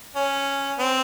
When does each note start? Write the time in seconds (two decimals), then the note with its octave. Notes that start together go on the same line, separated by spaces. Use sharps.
0.16 C#4
0.79 C4